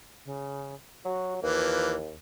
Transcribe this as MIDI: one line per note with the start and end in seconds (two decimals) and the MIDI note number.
0.25 0.74 49
1.05 1.39 54
1.05 1.34 66
1.42 2.16 39
1.42 1.96 52
1.42 1.96 53
1.42 1.96 58
1.42 1.94 71